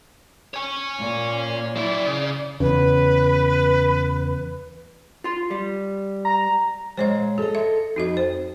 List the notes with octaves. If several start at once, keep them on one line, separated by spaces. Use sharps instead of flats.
C#5 G#5
A#2
F#3 E4 D5
C#3
E2 C#3 B4
F4 C6
G3
A#5
A#2 G#3 C5 C#5 D#5
G#4 A4 D#5
E5
F2 D#4 F#4 D#5
C5